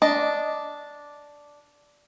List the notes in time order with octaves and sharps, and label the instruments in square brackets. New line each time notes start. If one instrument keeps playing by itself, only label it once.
[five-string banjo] D4 D#5